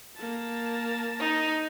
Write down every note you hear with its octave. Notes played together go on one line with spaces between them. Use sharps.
A#3 A5
D#4